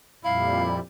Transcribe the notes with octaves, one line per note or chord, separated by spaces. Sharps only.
F2 A#2 G3 E4 F5